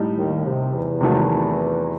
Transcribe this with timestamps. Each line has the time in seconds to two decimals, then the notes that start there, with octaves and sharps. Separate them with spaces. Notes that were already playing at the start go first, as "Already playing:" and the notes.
Already playing: A2 G3 D#4
0.16 D#2 D#3
0.45 C3
0.73 E2 E3
1.01 C3 D#3 F#3 A3